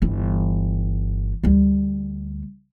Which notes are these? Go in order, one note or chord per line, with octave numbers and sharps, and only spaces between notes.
G1 E3
D2 G3